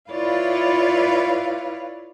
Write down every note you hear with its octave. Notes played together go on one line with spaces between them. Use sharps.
E4 F4 B4 C#5 D5 F5